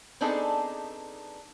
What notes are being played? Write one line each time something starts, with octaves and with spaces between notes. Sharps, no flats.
B3 C4 D4 D#4 G#4 A4